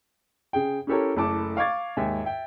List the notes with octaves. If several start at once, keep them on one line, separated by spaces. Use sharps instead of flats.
C#3 G#4 G5
C#4 E4 G4 A4 A#4 C#5
F#1 A3 E4 A4 A5 D6
F5 C#6 D6 G#6 A6
D#2 G#2 E5 G#5
E5 G5